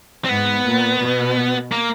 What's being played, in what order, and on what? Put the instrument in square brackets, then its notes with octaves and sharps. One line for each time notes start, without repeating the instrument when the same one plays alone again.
[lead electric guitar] C4
[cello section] G#2 [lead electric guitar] B3
[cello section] A#2
B2
[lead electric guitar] A#3